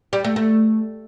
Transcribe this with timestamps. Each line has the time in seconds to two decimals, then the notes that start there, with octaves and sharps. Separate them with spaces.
0.13 G3
0.24 A3
0.36 A3